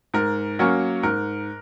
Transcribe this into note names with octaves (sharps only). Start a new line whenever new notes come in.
G#2 A#4
F#3 A#3 C#4 A#4
G#2 A#4